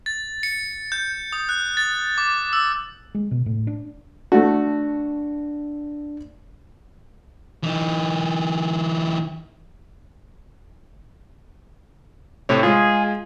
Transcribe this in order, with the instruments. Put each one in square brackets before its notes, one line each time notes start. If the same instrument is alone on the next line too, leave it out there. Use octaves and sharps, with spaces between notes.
[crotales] A6
C#7
G6
D#6
F#6
A6
D6
E6
[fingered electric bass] G#3
B2
A2
D4
[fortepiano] A3 F#4 [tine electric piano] D4
[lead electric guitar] E3 D#4
[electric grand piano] A2 C3 C#5
[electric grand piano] G#3 F4 [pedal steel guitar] G#4